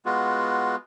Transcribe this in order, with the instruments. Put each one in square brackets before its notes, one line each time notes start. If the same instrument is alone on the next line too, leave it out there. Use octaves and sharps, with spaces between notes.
[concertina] G#3 B3 F4 F#4